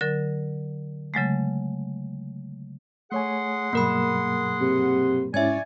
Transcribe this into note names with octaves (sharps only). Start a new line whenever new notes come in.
D3 F#3 A#4
C#3 F#3 G#3 A3
A3 G#4 C#5 F#5 G#5 C6
G2 B2 F#3 A#3 A#4 B5
C3
G#2 C#4 E4 C#5 D5 E5 G#5 G#6